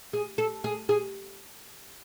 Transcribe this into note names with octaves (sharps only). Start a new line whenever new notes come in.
G#4
A4
G#4
G#4